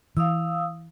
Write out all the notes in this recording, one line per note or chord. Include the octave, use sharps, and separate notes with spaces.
E3 F5 D#6 E6